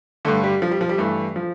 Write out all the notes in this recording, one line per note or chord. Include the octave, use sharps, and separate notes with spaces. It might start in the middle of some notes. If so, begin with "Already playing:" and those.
G2 D3 A3
G3
F3
G3
F3
G3
G2 E3 A3
F3